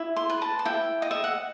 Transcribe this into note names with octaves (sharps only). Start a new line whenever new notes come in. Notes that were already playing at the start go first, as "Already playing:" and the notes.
Already playing: E4
C6
B4
A5
A5
E4 G5
D#5
E5
F#5